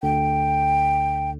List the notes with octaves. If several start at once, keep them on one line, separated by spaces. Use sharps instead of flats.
D2 D3 G5